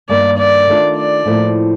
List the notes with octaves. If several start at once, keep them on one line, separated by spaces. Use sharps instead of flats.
G2 D#3 A#3 D5
D5
D#3 A3 D4 F4
D5
A2 F3 A#3